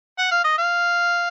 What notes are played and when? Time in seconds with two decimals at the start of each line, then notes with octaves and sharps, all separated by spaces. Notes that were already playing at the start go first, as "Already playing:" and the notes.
0.18 F#5
0.32 F5
0.44 D#5
0.58 F5